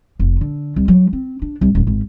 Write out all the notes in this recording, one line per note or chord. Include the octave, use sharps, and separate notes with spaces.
F1
D3
C2
F#3
C4
D4
C2
D#1
G#1